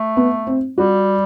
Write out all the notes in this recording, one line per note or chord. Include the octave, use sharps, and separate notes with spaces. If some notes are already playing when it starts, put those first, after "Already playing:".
Already playing: A3
B3
C4
G3 F#4